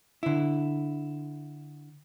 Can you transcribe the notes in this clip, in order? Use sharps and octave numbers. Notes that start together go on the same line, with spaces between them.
D3 E4